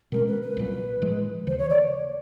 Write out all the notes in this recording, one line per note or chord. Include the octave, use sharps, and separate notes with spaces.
B2 G#3 C#4 A#4
B4
B4
C2 A#2 F#3
A2 F3 G#3
D#2 C#3 E3 C5
C#5
D5